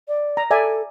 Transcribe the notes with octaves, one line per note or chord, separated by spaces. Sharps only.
D5
A#5
A4 D5 E5 G#5